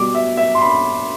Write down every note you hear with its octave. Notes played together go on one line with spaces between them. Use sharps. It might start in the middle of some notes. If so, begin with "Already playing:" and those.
Already playing: B2 G3 D6
E5
E5
C6
B5